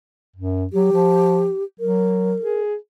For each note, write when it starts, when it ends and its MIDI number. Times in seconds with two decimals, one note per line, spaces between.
0.36 0.65 42
0.73 0.89 54
0.73 1.63 67
0.92 1.49 53
1.80 2.34 54
1.80 2.61 70
2.42 2.75 68